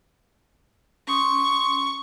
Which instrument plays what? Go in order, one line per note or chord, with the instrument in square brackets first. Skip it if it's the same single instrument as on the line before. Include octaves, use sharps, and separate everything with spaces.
[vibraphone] C#4 C6 D#6 [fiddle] C#6